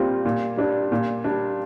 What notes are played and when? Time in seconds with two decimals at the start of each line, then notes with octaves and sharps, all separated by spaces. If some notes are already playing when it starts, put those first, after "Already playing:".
Already playing: A#2 G3 C4 F4
0.25 A#2
0.57 G3 D4
0.92 A#2
1.24 G3 D4